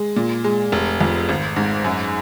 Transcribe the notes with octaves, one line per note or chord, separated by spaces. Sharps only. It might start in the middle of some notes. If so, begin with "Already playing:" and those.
Already playing: G#3
A#2
G#3
F1
F2
G#1
G#2
F#2